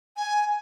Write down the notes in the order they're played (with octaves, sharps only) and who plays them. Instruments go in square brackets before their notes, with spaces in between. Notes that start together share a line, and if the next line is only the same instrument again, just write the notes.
[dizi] G#5